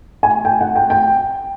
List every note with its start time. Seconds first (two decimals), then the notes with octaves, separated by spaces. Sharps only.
0.23 G#5
0.45 G5
0.61 F#5
0.76 G5
0.90 G5